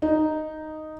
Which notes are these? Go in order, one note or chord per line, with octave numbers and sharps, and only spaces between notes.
D#4